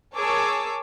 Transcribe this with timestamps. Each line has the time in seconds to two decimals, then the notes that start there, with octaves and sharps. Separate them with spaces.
0.15 G#4 A#4 C#5 A5 D6 E6